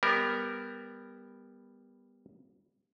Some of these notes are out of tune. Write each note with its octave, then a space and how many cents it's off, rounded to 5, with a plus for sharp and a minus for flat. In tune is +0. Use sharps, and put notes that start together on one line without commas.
G3 +15 B3 +0 A#4 +0